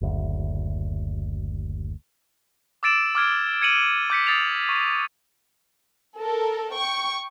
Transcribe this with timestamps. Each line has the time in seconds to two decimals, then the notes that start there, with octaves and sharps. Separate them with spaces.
0.01 F#1 D2
2.83 D6 E6 A6 D7 E7
3.15 D6 F6 G#6 D7
3.61 G#6 C#7 D#7 F#7
4.10 D6 G6 B6 C#7
4.27 D#6 A6 C7 F7
4.69 C#6
6.18 A4 A#4
6.74 G5 C#6